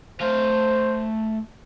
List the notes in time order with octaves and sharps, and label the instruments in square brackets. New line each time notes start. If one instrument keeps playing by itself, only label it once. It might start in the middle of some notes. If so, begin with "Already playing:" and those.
[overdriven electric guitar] A3 F5 [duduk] C5